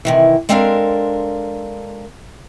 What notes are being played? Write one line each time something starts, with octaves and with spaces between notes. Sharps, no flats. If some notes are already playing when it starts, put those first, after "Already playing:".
C3 D#3 E3
G#3 C4 D4 A4 A#4 F5